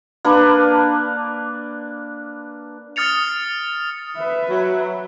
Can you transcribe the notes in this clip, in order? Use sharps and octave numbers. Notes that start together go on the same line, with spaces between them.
A#3 D4 B4
D#6 F6 A6 C#7 F7
B4 E5
F#3